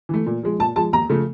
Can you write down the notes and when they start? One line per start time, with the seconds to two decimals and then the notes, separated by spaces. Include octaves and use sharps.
0.09 E3 A3
0.26 A#2
0.43 F3 G#3
0.59 A#2 A5
0.76 F3 G#3 A5
0.93 D#2 A#5
1.09 C#3 F3 A3